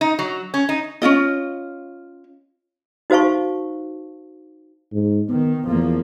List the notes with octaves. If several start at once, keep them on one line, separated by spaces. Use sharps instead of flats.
D#4
F#3
C#4
D#4
C#4 D#4 F4 D#5
D#4 F#4 C5 F5 A5 C#6
G#2
D#3 B3
E2 F3 A#3